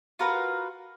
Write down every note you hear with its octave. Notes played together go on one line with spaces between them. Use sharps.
F4 F#4 A#4 B4